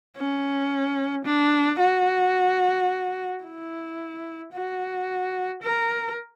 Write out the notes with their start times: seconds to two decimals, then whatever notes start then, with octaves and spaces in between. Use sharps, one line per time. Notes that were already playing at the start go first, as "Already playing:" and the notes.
0.16 C#4
1.25 D4
1.80 F#4
3.43 E4
4.53 F#4
5.62 A#4